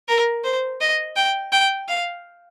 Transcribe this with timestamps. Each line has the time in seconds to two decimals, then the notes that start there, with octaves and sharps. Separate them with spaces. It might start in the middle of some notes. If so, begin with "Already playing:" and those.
0.08 A#4
0.44 C5
0.81 D#5
1.16 G5
1.52 G5
1.88 F5